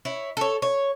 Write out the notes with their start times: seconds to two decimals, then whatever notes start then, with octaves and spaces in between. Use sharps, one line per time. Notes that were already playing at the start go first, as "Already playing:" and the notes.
0.05 E4 C#5
0.37 A4 C#5
0.62 C#5